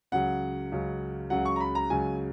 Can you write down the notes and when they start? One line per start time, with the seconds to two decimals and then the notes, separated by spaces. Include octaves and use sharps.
0.12 C#2 C#3 F#3 F#5
0.72 C#2 C#3 F#3
1.30 C#2 C#3 F#3 F#5
1.45 C#6
1.56 A#5
1.60 B5
1.75 A#5
1.90 C#2 C#3 F#3 G#5